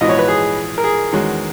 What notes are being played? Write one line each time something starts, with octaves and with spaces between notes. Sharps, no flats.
A#1 G#2 E3 B3 F#4 D#5
C#5
B4
G#4
A#4
G#4
E2 D#3 G#3 C#4 F#4